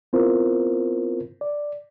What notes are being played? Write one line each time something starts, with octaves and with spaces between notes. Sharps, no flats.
B3 C4 E4 F4 A#4 C5
D5